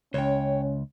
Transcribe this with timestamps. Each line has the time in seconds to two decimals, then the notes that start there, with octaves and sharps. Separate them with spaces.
0.14 C#2 C#4 C#5 G5